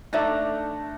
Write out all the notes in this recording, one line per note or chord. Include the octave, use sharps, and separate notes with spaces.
A3 D4 D#4 D5 E5 A#5